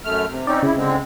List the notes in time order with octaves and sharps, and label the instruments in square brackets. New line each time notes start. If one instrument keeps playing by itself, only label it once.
[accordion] F#2 A3 F6
C3
[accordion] C4 C#4 D#4 [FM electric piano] D5
[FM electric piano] C#3 [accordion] E4
[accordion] D3 G#3 C4